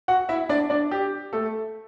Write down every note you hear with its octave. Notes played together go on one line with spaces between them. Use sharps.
F#4 F#5
E4 E5
D4 D5
D4 D5
G4
A3 A4